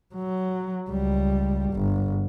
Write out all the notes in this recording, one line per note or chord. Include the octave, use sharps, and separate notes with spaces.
F#3
C#2 G3
G1